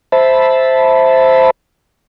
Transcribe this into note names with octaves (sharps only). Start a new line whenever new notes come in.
C5 E5 A5 B5